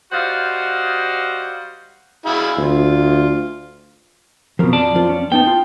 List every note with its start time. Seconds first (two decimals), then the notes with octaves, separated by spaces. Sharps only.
0.12 G3 F#4 C5 D#5 F5 F#5
2.26 E4 G#4 F5
2.57 D2 F4
4.59 F2 B2 F3 A#4
4.73 F2 D5 A5
4.95 F3 F4
5.09 C#4
5.32 B3 D#4 G5 A5
5.47 F4